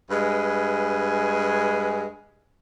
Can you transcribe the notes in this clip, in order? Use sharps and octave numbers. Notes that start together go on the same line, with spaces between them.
G2 G#3 B4 G#5